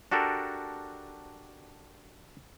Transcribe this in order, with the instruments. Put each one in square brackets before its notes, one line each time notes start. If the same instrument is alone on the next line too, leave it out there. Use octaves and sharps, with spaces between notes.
[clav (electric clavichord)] D4 F#4 G4 A4 A#4